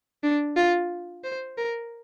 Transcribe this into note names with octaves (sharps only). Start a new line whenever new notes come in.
D4
F4
C5
A#4